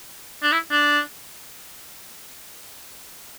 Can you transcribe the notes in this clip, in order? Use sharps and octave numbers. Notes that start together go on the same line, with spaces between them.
D4
E4
D4